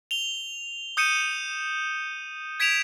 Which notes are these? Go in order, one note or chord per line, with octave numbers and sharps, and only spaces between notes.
F7 G7
D#6 G6 C#7 D#7 E7
G#6 B6 D7 E7 F7